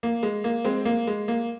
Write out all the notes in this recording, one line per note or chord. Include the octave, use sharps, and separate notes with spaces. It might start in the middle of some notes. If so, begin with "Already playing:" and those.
A#3
G#3
A#3
G#3 C4
A#3
G#3
A#3